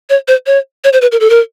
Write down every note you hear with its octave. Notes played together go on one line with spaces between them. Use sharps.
C#5
C5
C#5
C#5
C5
B4
A#4
A4
A#4